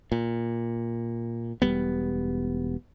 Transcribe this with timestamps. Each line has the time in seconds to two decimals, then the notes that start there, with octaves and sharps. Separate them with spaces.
0.12 A#2
1.62 E1 F#2 G3 B3